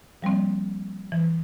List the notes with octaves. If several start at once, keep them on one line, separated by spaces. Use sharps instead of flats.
F3 G3 A#3 C4
E3